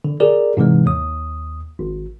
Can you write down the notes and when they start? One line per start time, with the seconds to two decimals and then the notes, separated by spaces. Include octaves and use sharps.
0.05 D3
0.20 G4 G#4 A#4 D5
0.57 G#2 C3 E3 G#3
0.86 D#2 D#6
1.79 G#1